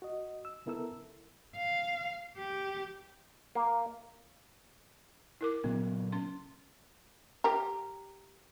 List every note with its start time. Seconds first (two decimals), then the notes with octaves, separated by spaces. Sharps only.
0.02 F#4 D#5
0.45 E6
0.66 C#3 B3 E4 A4 A#4 E6
1.56 F5
2.37 G4
3.55 A#3
5.41 E4 A#4 D6
5.64 A#2 C#3 F#3 B3
6.12 C#4 C6
7.44 G4 A#4